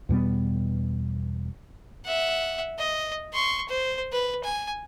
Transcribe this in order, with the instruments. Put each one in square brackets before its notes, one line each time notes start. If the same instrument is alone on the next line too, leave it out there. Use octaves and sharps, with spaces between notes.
[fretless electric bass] E2 B2 G3 B3
[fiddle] E5 F#5
D#5
C6 C#6
C5
B4
G#5